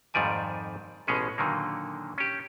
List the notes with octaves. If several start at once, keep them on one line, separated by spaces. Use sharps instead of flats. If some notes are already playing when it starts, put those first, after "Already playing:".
F2 G#2 D#3 G3 D5 G#5
A1 B2 G#3 C#4 G#4
A#2 D3 D#3 F#3 A#3
C#4 G4